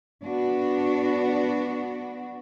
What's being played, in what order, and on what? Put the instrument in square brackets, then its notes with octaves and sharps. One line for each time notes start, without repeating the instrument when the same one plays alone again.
[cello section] B3 D4 F#4